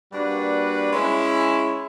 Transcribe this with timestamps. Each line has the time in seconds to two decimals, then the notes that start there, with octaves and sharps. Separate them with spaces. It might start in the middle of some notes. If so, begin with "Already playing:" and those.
0.12 G3 A#3 D4 F#4 B4
0.92 G#3 C#4 E4